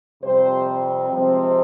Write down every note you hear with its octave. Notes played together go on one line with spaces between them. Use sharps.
F2 C3 G3 C4 C5
C3 F3 G#3 C4